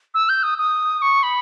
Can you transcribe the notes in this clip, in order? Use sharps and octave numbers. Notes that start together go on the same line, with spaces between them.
E6
G6
D#6
D#6
C#6
B5